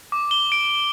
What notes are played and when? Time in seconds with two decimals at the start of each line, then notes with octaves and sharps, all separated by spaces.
0.12 D6
0.31 G7
0.52 D7